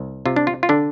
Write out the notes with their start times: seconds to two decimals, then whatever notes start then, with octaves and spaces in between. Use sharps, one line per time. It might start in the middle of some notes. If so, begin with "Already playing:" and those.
Already playing: C2
0.26 C3 F4
0.36 D4
0.47 F4
0.63 F4
0.69 D3 D4